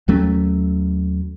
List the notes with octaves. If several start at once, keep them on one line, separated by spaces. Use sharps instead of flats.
D#2 F#3 A3 C#4